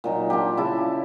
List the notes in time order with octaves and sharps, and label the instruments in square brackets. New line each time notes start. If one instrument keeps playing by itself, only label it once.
[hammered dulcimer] A#2 F#3 D#4
D4 F4 G4
C#3 E4 A5